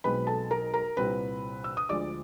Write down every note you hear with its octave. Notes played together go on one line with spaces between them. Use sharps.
B1 B2 G#3 C4 B4 B5
A4 A5
A#4 A#5
A#4 A#5
C2 A#2 G3 C4 B4 B5
E6
D#6
D2 D3 F3 G#3 D5 D6